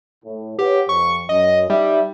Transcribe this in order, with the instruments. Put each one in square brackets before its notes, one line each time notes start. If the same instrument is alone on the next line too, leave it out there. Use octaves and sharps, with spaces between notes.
[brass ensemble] A2
[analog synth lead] G4 [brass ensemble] B4 C#5 F#5
[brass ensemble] F2 [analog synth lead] C#6
[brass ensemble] F#2 [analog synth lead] D#5
[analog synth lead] G3 [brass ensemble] D#4 E5